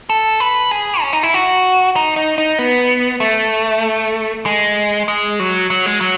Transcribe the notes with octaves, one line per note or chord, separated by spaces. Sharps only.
A4
B4
G#4
C#4
D#4
E4
F#4
D#4
D#4
D#4
B3
A3
G#3
G#3
F#3
F#3
G#3
F#3